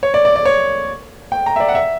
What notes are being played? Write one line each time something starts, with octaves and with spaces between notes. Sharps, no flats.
C#5
D5
D5
D5
C#5
G5
A#5
E5
D5
F#5
E5